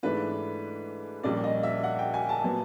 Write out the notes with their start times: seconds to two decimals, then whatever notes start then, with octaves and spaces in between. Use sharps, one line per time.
0.03 G#2 E3 A3 D4 B4
1.23 A#1 A#2 G3 A#3 C#4 D5
1.44 D#5
1.63 E5
1.83 F#5
1.99 G5
2.14 G#5
2.29 A5
2.44 A#2 F#3 B3